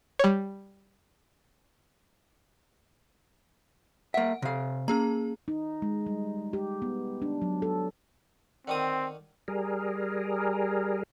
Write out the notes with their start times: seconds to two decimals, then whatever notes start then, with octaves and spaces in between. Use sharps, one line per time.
0.19 G3 C#5
4.14 A#3 E5 F#5
4.42 C3 F5
4.88 A#3 C#4 G#4 A#5
5.48 D#4
5.82 G#3
6.06 G3
6.53 G4
6.82 B3
7.22 D4
7.42 F#3
7.62 A4
8.68 D3 D#3 C4 D#6
9.48 G3 G#4 A#4